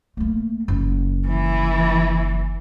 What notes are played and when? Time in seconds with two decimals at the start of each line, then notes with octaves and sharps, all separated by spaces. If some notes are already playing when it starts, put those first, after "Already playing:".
0.17 A3 A#3
0.68 F#1 D#3
1.27 E3